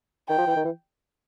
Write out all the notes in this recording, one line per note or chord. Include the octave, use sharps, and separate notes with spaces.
D#3 G5
F3
E3
D#3
E3